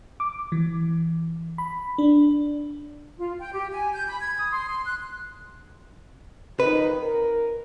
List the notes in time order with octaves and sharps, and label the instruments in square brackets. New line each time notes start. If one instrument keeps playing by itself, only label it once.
[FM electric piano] D6
E3
B5
D4
[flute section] F4
G5
G4
G#5
G6
B5
G#6
D#6
C6
C6
F#6
[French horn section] F2 D#3 D#4 [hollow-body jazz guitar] B4
[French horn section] A#4